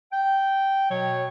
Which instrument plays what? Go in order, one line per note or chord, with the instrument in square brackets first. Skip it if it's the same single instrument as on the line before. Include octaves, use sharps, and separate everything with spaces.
[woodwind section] G5
B2 F#3 C#5